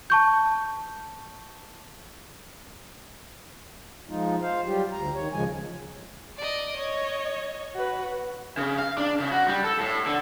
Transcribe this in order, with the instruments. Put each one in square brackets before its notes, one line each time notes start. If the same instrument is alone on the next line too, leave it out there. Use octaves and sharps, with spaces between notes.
[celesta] A5 C#6 G6
[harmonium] F3 G#3 D#4 F4
C5 F5
F#3 G3 F4 G4
D2 A#5
D#3 C#5
D2 C#3 F3 G#3 G#5
[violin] D5 D#5
[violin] C#5 [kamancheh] D#5
[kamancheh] F#4 B4
[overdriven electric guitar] C#3
F5
D4
C#3
F#4
G3
A4
A2
D3